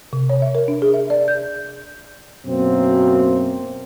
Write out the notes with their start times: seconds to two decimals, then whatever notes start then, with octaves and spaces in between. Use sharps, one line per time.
0.13 C3
0.29 C#5
0.42 E5
0.55 A#4
0.68 D4
0.82 G#4
0.94 E5
1.10 D5
1.28 G6
2.46 F#2 B2 A#3 C4